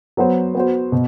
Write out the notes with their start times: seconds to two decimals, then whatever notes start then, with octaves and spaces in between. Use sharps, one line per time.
0.17 F#3 B3 F#4 C5
0.55 B3 F#4 C5
0.92 B2